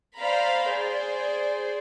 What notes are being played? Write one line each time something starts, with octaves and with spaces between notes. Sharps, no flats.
C5 D5 F5 A#5 B5
G#4 C5 D5